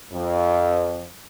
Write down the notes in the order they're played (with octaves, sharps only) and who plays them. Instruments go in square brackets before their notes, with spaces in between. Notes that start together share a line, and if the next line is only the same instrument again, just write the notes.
[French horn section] F2